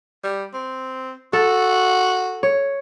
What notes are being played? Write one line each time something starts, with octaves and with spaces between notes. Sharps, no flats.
G3
C4
F#4 A4
C#5